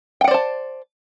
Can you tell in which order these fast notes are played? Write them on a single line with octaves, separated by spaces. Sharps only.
G5 F#5 D5 C5 A5